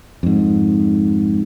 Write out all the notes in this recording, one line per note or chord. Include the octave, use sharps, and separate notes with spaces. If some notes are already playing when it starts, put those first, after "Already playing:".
F2 G#2